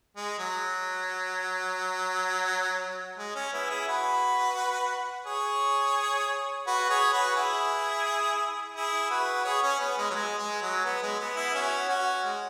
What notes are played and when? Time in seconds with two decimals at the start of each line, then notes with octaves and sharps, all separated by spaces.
0.16 G#3
0.39 F#3
3.18 G#3
3.35 C#4
3.53 B3 E4
3.70 E4 G#4
3.87 F#4 B4
5.26 G#4 C#5
6.66 F#4 B4
6.90 G#4 C#5
7.13 F#4 B4
7.36 E4 G#4
8.75 E4 G#4
9.10 F#4 B4
9.45 G#4 C#5
9.62 C#4
9.80 B3
9.98 G#3
10.10 F#3
10.15 G#3
10.38 G#3
10.62 F#3
10.85 B3
11.02 G#3
11.19 B3
11.36 B3 E4
11.54 C#4 F#4
11.89 C#4 F#4
12.24 G#3